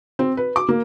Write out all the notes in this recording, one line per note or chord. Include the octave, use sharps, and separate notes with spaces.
C4
B4
D6
A#3